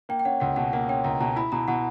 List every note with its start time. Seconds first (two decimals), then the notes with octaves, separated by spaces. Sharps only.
0.09 A#3 G5
0.19 G5
0.25 C#4 F#5
0.40 C#2 F#5
0.56 B2 F#5
0.73 A#3 F#5
0.89 C#4 G5
1.04 C#2 A#5
1.20 B2 A#5
1.36 E4 B5
1.52 B2 A#5
1.68 B2 F#5